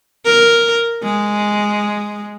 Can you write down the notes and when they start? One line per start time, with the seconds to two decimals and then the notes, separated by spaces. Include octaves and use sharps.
0.25 A#4
1.03 G#3